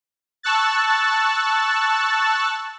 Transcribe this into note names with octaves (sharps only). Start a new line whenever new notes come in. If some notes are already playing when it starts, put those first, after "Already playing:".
A5 C#6 E6 F#6 A6